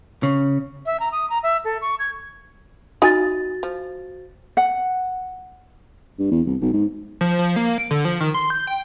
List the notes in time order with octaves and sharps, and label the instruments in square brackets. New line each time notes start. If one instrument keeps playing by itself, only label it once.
[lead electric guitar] C#3
[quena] E5
A#5
D#6
A#5
E5
A4
C#6
G#6
[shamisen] D#4 F4 G#5 [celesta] F#4 A6
[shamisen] F3
[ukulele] F#5
[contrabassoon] G2
E2
C2
B1
G#2
[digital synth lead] F3
F3
A#3
D7
D3
F3
D#3
C6
G6
G5